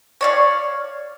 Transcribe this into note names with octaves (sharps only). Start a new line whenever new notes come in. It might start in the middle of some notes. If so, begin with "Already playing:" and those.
C#5 D5 F5